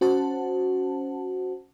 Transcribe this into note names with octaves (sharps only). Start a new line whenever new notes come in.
C#4 F#4 C5 F#5 A5